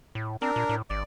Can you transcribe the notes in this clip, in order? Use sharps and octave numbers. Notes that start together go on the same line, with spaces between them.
A2
C4 D4 A#4
A#2
A2
G#1 D5